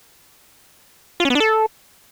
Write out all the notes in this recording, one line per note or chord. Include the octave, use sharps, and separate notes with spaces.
F4
C#4
B3
D4
A4